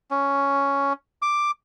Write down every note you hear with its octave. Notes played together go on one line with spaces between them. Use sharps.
C#4
D6